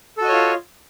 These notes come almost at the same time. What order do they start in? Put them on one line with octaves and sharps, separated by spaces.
A4 F#4 D#5 C#5 F4